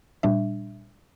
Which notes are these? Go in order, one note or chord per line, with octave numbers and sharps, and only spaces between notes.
A#2 G3 D4 E5